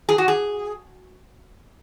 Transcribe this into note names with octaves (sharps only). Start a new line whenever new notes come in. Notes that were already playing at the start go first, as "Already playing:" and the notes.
G#4
F#4
G#4